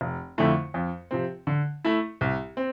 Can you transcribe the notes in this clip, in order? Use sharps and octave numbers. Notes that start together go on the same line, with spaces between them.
F1
F2 D3 A3 E4
F2
C3 F3 C4
D3
A3 E4
C2
C4